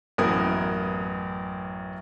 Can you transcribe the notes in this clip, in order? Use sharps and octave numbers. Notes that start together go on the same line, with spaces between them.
A1 F#2 B3 A#4 D#6 G#6